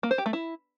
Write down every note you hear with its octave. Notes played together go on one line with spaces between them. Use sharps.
A#3
C5
G4
A3
E4